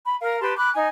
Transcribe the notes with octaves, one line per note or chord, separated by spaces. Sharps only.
B5
A#4 F5
G4 B4 A5 C6
B5 D6 F#6
D#4 G#5